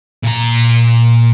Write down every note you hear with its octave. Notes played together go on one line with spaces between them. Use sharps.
A#2 A#5